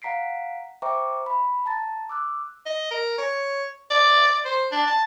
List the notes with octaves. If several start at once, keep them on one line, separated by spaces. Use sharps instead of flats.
F5 F#5 A#5 B6 C7 D7
C5 E5 G5 A#5 C#6 D6
B5
A5 A#5 A6
D6 E6 F#6
D#5
A#4
C#5
D5
C5
D4
A5